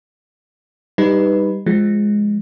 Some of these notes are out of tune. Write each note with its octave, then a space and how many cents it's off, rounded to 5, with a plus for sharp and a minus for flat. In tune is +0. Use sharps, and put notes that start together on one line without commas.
G3 +10 D#4 +0 B4 +0
F3 +0 G#3 +0